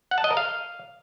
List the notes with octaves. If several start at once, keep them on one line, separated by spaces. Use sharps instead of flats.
F#5
A5
D#5
A#4
F5